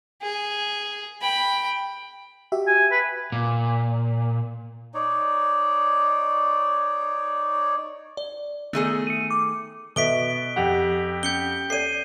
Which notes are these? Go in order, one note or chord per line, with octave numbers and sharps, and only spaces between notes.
G#4
G5 B5
F#4 G4 E5
G#5
B4
A#2
D#4 C#5 D5
D5
D#3 A3 B3 G#4
C#7 D#7
D6
B2 A4 E5 B6 D7 G7
F2 G4 F#5
C#4 G6 C#7 G7
A4 C#5 D5 C7 D#7